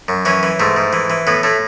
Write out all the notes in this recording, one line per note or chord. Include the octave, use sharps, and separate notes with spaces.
F#2
E3 C#4
E3
G#2 A3
G#2
E3
E3
A2 B3
A2 A3